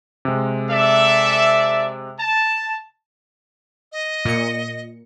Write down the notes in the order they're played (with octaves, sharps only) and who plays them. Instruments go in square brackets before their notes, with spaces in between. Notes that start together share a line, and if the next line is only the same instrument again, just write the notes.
[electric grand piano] C3 G#3
[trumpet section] A4 D5 E5
A5
[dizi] D#5
[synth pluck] A#2 C#7